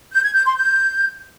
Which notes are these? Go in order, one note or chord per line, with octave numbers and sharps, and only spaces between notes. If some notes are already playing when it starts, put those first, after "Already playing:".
G6
G#6
G6
C6
G6